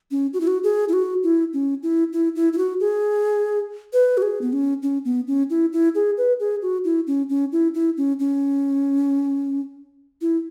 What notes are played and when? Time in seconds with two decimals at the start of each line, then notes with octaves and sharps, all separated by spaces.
0.11 C#4
0.33 F#4
0.41 E4
0.47 F#4
0.64 G#4
0.89 E4
0.93 F#4
1.23 E4
1.53 C#4
1.83 E4
2.13 E4
2.36 E4
2.53 E4
2.58 F#4
2.80 G#4
3.93 B4
4.17 F#4
4.22 G#4
4.41 B3
4.53 C#4
4.83 C#4
5.05 B3
5.27 C#4
5.50 E4
5.73 E4
5.95 G#4
6.18 B4
6.40 G#4
6.62 F#4
6.85 E4
7.07 C#4
7.29 C#4
7.52 E4
7.74 E4
7.97 C#4
8.20 C#4
10.21 E4